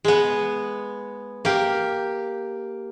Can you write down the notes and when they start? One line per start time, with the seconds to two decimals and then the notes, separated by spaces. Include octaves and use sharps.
0.05 G#3 B3
1.45 A#3 G4